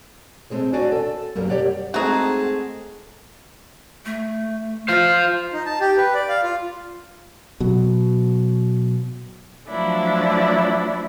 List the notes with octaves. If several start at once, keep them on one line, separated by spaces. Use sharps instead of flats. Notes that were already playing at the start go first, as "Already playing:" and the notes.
G#3 A3 C4 G#4 C#5
D4 F#4 C#5 D5 G#5
A4
F#2 F#3 G3 A#3 B3
G4 C#5 D5 F#5
G#3 A3 C4 D#4 F#4 G#4 A5
A3
F4 C5 F5
D#4
A5
G4
B4
D5
F5
F4
B2 F#3
F3 F#3 A3 D4 E4 D5